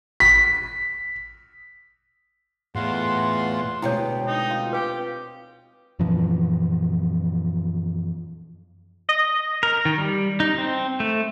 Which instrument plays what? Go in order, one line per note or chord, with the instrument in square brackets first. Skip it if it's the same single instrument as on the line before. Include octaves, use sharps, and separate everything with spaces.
[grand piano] B6
[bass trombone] E2 [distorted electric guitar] A2 [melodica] F4 F#5 C6
[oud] D2 B2 G#3 [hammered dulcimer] C4 G4 F5 [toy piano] E4 C#5
[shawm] D#4
[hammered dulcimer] F4
[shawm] G4 [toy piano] B4 G5
[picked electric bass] F#2 A#2 E3 F3
[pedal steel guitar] D#5
A#4
D#3
G3
D#4
C4
A3